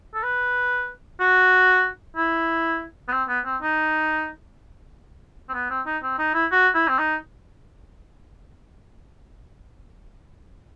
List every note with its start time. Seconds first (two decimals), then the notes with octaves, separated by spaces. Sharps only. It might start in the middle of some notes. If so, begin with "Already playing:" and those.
0.14 A4
0.23 B4
1.20 F#4
2.16 E4
3.08 B3
3.12 C4
3.28 B3
3.45 C4
3.62 D#4
5.49 C4
5.54 B3
5.70 C4
5.86 D#4
6.03 C4
6.18 D#4
6.34 E4
6.51 F#4
6.75 E4
6.88 C4
6.99 D#4